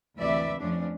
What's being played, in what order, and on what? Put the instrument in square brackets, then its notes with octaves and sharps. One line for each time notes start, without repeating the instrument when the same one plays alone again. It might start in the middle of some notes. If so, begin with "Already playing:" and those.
[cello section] D2 C3 E3 B4 D5 E5
F2 F3 A3 C#4 D4